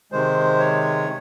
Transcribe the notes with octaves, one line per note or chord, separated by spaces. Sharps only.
C3 D#3 G#3 C5
C#5